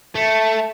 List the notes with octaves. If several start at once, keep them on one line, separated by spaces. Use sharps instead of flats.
A3